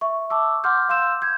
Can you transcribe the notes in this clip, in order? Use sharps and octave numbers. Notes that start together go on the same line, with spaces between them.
E5 C#6
A5 D6 E6
F#5 C6 D6 F6 G6
F5 C6 E6 G6 E7
G6 G#6